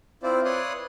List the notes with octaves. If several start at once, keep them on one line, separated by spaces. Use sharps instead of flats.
C4 E4 F4 C5 D5
B4 C#5 D5 C6 D#6 F#6